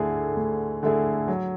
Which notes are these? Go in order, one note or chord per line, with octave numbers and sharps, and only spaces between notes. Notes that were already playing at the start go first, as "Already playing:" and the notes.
Already playing: D2 D3 A3 E4 G#4
D2
D3 A3 E4 G#4
F#3